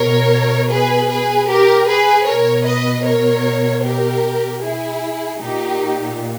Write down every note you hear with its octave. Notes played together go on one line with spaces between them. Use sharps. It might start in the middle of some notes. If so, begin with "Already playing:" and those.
Already playing: B2 A#4 C#5
G#4 B4
G#4 B4
G4 A#4
G#4 B4
B2 A#4 C#5
B4 D#5
A#4 C#5
G4 A#4
E4 G#4
A#2 D#4 G4